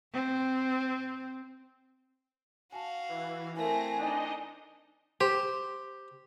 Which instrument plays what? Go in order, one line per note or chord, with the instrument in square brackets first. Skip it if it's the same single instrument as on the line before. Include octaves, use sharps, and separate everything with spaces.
[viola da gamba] C4
[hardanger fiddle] F#4 F5 [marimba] G#5 A5
[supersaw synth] E3
[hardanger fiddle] A3 C4 [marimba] E4 A#4 E5 [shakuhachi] G#5 [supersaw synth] A#6
[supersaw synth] D4 D#4 D#5
[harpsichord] G4 [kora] C5